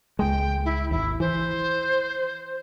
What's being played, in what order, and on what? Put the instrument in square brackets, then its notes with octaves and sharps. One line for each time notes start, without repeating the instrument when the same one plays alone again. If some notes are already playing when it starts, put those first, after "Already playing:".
[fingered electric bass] C#2 G#3 [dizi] G5
[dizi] E4
[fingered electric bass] G#1 D#2 [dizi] E4
[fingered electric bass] E3 [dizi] C5